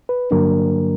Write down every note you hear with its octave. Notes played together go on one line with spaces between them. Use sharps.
B4
G2 D3 F#3 A#3 D4 A#4